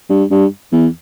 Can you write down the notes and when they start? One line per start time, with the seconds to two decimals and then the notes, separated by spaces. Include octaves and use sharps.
0.10 G2
0.31 G2
0.72 E2